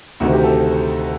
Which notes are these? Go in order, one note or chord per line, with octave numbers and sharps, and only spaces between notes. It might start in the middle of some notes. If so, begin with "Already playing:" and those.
D2 C3 D#3 F#4
G4
A4